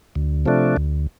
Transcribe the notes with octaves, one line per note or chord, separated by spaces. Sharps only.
D2
C3 F3 A3 D4
D2